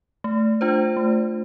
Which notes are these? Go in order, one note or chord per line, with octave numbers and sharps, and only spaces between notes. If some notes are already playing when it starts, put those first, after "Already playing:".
A3
D4 F4 C5
A3